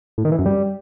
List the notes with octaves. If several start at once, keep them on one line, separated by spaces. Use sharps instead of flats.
A2
D#3
E3
F#2
G3